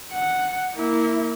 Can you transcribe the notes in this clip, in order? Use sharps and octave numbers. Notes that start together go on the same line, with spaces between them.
F#5
A#3 E4